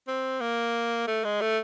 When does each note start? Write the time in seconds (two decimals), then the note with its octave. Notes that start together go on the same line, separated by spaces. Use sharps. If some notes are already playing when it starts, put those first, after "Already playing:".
0.08 C4
0.41 A#3
1.07 A3
1.24 G#3
1.41 A3